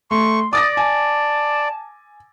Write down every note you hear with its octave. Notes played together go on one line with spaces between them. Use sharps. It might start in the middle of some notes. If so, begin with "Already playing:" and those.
A3 C6 C#6
D5 D6 D#6 A6 A#6
G#5 A5